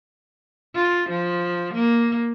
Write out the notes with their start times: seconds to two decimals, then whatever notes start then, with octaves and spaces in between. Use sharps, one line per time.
0.75 F4
1.09 F3
1.74 A#3